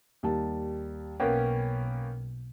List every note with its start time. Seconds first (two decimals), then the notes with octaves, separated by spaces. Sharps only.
0.23 D#2 G3 A5
1.20 B1 A#3 B3 C#4 G5